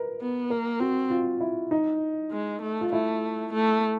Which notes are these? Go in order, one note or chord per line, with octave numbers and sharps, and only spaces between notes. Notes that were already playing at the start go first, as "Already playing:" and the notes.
Already playing: A#4 B4
B3
A#3 A#4
C4 F#4
F4
E4
D#4
G#3
A3
F4
A3 E4
A3